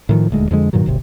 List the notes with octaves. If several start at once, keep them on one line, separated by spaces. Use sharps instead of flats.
A2 D#3 F3
D#1 D2 G#3
F2 D3 G#3
G2 A#2 D#3 F#3
D#1 G#1 C3